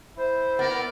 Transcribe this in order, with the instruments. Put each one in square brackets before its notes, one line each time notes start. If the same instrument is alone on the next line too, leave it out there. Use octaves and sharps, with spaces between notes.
[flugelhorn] E4 [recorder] C5
[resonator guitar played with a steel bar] B3 [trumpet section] A#4 D5